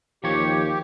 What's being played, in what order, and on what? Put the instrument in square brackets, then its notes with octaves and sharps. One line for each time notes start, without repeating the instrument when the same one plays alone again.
[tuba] D#2 [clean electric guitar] F3 C#5 [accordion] G4